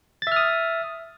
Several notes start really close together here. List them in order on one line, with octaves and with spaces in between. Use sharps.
A6 E5 F6 D#6